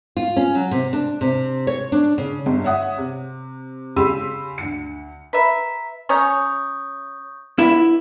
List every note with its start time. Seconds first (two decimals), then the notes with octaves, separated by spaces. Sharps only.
0.17 F4
0.36 C#4
0.55 F#3
0.71 C3
0.93 D4
1.21 C3
1.67 C#5
1.92 D4
2.18 C#3
2.46 G1
2.64 C#5 E5 F#5 D#6
2.98 C3
3.96 C#3 G4 B5 C6 E6 D#7
4.58 D2 C#7
5.33 B4 E5 A#5 B6
6.09 C#4 C#5 A#5 C#6 D#6 G6
7.59 D3 E4 B4